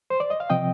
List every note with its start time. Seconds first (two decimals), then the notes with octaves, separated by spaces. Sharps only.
0.10 C5
0.20 D5
0.30 D#5
0.40 F5
0.50 C3 F3 C4 D#5 G5